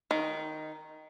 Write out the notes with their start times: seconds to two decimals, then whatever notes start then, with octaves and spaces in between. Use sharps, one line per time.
0.11 D#3